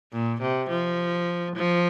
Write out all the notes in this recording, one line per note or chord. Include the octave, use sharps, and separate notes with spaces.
A#2
C3
F3
F3